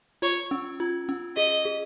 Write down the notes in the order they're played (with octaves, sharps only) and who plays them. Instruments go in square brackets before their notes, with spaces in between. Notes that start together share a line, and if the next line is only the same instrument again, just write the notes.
[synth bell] F4 [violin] C#5
[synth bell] C#4
F4
C#4
[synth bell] G#4 [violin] D#5
[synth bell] G#4